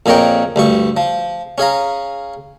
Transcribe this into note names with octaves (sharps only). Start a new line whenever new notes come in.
F2 A#2 G#4 A#4 C#5 G5
D2 G2 C#6
F3
C#4 G#4 F5 A#5